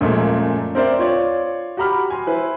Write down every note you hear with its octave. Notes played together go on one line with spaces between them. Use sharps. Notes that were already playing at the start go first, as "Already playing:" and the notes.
F#2 A#2 F3 G#3 A3
C4 A#4 C5 D5 E5 G5
F4 C#5 D5
F#4 G4 A#5 B5 F6
G#5 C6
E4 B4 C5